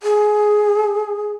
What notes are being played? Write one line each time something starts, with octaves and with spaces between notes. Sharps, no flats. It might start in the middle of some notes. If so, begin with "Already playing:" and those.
G#4